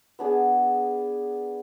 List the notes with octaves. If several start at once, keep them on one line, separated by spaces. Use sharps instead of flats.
B3 D4 G#4 G#5